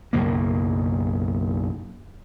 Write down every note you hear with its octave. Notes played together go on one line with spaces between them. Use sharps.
B1 F#2 C#3 A#3